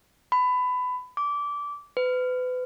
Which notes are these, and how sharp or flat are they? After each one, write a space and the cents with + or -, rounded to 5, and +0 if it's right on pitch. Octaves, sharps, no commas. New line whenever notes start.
B5 +20
D6 -20
B4 +35